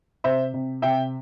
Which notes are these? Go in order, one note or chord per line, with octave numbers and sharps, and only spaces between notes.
C3 C5 E5
C3
C3 E5 G5